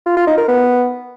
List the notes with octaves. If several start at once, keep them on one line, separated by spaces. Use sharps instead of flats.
F4
F4
D#4
A#4
B3